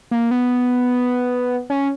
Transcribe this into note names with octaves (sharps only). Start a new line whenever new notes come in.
A#3
B3
C#4